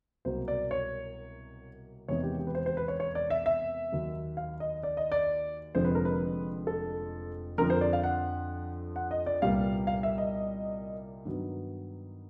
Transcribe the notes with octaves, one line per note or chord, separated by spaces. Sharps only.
C2 B2 F#3 A#3 C5
D5
C#5
E2 C3 D#3 G#3 B3 C#5
G4
G4
B4
C5
C5
B4
C#5
C#5
D5
E5
E5
D#2 D#3 F#3
F5
D#5
D5
D#5
D5
F1 F2 D3 F3 G#3 C5
B4
A#4
B4
A4
F2 D3 F3 A#4
C5
D5
F5
F#5
F#5
D#5
D5
C2 A#2 G3 B3 F5
F5
E5
D#5
G2 D#3 F#3 B3